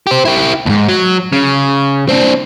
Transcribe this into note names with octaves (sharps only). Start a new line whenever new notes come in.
G4 C5
E4 G4
D#2 G#2
F#3
C#3
C4 D4